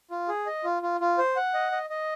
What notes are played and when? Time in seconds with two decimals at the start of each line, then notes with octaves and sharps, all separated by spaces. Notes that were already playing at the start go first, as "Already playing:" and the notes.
0.11 F4
0.28 G#4
0.46 D#5
0.64 F4
0.83 F4
1.01 F4
1.18 C5
1.36 F#5
1.54 D#5
1.72 D#5
1.90 D#5